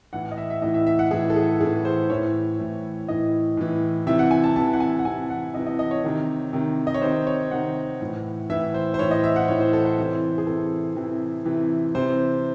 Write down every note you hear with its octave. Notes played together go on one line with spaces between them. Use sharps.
A2 E3 F#5
D#5
E5
E5
A2 E3 D#5
E5
E5
F#5
A2 E3 G#4
A4
G#4
A2 E3 G#4
C5
A2 E3 C#5
A2 E3
A2 E3 D#5
A2 E3
C3 E3 E5
F#5
G#5
A5
C3 E3 A5
F#5
G#5
F#5
C3 E3 G#5
F#5
C3 E3 D#5
D#5
D#5
C#5
C3 D#3
C3 D#3
D#5
C#5
C3 D#3 C5
C#5
C3 D#3 F#5
A2 E3
A2 E3 E5
C5
C5
A2 E3 C#5
D#5
E5
F#5
A2 E3 C#5
C5
A4
C5
C3 E3
G#4
C3 E3 A4
C3 E3
C3 E3
C3 E3 C5